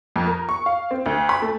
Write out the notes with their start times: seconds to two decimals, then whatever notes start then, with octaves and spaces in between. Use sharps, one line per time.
0.16 F2
0.27 A#4
0.49 C#6
0.66 F5
0.91 C4
1.06 D2
1.29 B5
1.42 A3